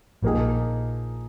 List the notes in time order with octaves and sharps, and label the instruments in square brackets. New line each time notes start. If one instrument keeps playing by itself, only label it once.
[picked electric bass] A#1 A#2 [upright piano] F3 A#3 D#4 G#4